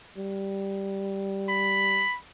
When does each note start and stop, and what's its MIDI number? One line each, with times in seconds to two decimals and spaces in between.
0.17 2.04 55
1.49 2.17 83